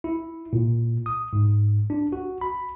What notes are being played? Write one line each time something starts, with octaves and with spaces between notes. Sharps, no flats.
E4
A#2
D#6
G#2
D4
F#4
B5